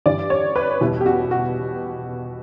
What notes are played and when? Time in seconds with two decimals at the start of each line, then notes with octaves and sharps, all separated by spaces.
0.06 G2 E3 G3 D5
0.30 C#5
0.56 B4
0.81 E2 B2 G3 E4
1.01 G4
1.06 F#4
1.31 F#4